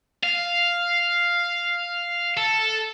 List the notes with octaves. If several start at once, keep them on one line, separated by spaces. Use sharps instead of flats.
F5
A4